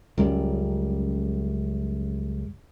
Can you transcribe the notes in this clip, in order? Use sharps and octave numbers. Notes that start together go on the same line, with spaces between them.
C#2 F#2 G3